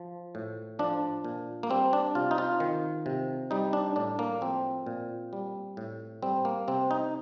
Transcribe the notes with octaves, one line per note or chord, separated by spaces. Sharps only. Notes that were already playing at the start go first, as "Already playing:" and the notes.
Already playing: F3
A2
F3 D4
A#2
A#3
G3 C4
D4
C3 F4
D#4
F4
D#3
C3
G3 D#4
D4
A2 D4
A#3
F3 C4
A#2
G3
A2
G3 C4
A#3
C3 C4
D#4